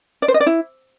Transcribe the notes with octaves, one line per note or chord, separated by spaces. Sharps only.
D5
C5
D#5
D5
E4